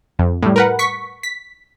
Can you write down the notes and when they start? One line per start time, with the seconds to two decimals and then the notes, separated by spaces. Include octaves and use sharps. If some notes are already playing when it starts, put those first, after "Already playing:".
0.19 F2
0.42 A2 G3
0.56 A#4 B4 F#5
0.79 C#6 B6
1.23 B6